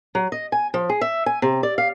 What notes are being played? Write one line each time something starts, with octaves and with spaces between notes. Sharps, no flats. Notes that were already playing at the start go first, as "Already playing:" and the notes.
F#3
D#5
G#5
F3
G#4
E5
G#5
C3
D5
F5